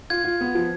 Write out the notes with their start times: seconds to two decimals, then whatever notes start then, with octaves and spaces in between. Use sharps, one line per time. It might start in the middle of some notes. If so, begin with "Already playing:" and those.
0.10 F4 G#6
0.24 F4
0.41 B3
0.55 F3